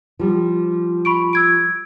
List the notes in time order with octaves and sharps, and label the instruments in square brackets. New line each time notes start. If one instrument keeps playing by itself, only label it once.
[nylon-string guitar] F3 G3
[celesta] B5 C#6 D7
E6 G#6 D7